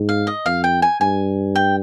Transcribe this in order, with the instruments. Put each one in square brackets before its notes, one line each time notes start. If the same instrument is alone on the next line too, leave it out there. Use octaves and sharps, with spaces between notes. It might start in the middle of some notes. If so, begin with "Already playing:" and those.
Already playing: [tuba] G#2
[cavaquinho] F5
D#5
[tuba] F2 [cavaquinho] F5
[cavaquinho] G5
G#5
[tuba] G2 [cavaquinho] G#5
[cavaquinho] G5